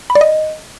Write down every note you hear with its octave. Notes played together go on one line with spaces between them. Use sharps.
B5
D5
D#5